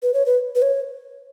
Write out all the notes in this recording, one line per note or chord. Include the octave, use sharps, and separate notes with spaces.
B4
C#5
B4
B4
C#5